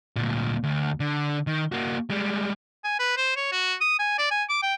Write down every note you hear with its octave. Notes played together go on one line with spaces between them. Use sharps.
D2 A#2
D2
D3
D#3
A#3 F#4
G3 G#3
G#5
B4
C5
C#5
F#4
D#6
G#5
D5
G#5
D6
G5